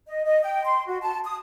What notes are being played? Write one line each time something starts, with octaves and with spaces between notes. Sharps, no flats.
D#5
D#5
G5
C6
F#4
A5
D#6